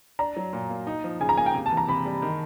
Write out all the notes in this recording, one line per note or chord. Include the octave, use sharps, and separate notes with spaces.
D4 A#5
F#3
A#2
A#3
D#4
F3
C#3 G#5
A#5
A#3 G#5
G5
C3
A5
E3
A#5
C3 B5
G3
D#3